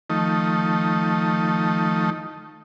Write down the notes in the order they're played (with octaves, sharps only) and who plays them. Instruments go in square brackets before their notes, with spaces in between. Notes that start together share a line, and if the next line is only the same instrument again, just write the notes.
[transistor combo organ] D#3 F3 A3 D#4